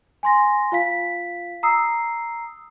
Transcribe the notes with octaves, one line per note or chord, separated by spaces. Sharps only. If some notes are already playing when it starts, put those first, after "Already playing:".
G#5 C6 A#6
F4 F5 B6
A#5 D#6 E6 C7